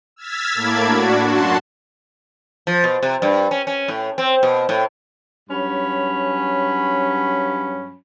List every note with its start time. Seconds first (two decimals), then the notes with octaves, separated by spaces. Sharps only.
0.16 E6 F6 G#6 A6 B6
0.54 A2 A#3 A5 B5 D6 G#6
0.84 D4 F#4
1.26 F#2 F#4 A5 C6
2.67 F3
2.84 B2
3.03 C3
3.22 G2
3.51 C#4
3.67 C#4
3.88 A2
4.18 C4
4.43 B2
4.69 A2
5.50 G2 F#3 C#4 B5